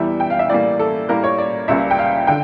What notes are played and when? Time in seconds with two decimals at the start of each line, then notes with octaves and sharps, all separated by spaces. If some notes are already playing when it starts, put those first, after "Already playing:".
Already playing: E2 E3 G3 E5
0.20 G5
0.30 F5
0.39 E5
0.50 A2 E3 G3 A#3 D5
0.79 A4
1.09 A2 G3 A#3 A#4
1.24 C#5
1.38 D5
1.68 C#2 C#3 G3 A#3 E5
1.91 G5
1.98 F5
2.27 D3 G5